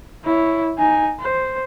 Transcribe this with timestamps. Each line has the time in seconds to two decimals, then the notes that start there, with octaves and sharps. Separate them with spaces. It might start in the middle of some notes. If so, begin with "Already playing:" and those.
0.24 E4 C#5
0.78 D#4 G#5
1.20 C5